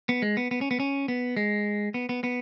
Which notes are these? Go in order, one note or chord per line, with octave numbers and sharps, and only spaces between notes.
B3
G#3
B3
B3
C#4
B3
C#4
B3
G#3
B3
B3
B3